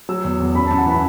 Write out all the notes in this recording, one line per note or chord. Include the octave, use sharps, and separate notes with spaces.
F#3 E6
E2
E2
F#2 B5
F#2 A5
F#5
E3 B5